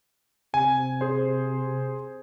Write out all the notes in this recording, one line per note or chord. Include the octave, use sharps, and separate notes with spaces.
C3 G#5
G#4 C5